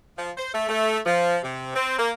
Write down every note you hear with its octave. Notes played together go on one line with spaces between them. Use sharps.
F3
C5
A3
A3
F3
C3
C4
A#3